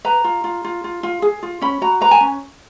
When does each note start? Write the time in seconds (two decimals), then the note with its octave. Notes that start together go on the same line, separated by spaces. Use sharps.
0.05 B4 A#5
0.24 F4
0.44 F4
0.65 F4
0.84 F4
1.03 F4
1.22 G#4
1.43 F4
1.61 C#4 B5
1.81 F#4 A#5
2.01 B4 A#5
2.11 G#5
2.21 C#4